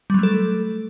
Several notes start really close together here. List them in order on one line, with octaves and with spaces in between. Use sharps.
G3 F#3 A3 A4